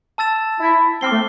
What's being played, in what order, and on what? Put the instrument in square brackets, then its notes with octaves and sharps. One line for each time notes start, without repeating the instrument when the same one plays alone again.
[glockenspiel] A5 E6 A6 E7
[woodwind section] E4
[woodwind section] C4 [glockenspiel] D6 F6 C7 G7
[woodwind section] A3